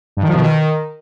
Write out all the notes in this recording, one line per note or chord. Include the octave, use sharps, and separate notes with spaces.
G2
D#3
F3
B2
D#3